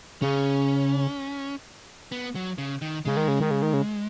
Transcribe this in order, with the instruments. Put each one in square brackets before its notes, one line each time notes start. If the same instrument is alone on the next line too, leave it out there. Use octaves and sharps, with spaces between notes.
[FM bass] C#3 [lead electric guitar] C#4
[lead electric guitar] B3
F#3
C#3
D#3
[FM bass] C#3 [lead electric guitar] G#3
[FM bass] D#3
C#3
D#3
C#3
D#3
C#3